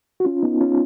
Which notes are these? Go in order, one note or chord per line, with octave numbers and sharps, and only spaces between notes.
F#4
C#4 F4
B3 D#4
C#4 F4